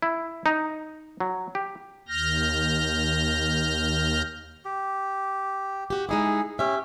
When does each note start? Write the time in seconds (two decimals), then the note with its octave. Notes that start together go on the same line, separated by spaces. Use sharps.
0.02 E4
0.46 D#4
1.20 F#3
1.55 G4
2.08 D#2 F6 G6 A#6
4.65 G4
5.90 F#4 G4
6.09 G#3 D#4 E4 G#4
6.59 C#4 G4 E5